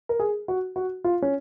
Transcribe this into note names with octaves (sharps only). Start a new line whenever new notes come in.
A#4
G#4
F#4
F#4
F4
C#4